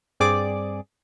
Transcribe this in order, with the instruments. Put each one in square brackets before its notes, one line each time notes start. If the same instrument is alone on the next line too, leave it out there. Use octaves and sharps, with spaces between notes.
[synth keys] G2 C4 G#4 D5 D6